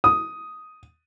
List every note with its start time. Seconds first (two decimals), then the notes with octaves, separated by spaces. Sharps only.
0.04 D#6